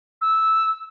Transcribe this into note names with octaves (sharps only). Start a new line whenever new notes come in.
E6